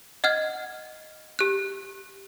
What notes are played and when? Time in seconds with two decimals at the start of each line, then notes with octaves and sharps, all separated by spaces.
0.24 D#5 F#5 F6 G#6
1.39 G4 F#6